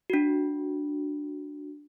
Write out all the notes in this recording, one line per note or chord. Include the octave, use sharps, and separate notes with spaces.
D4 F#4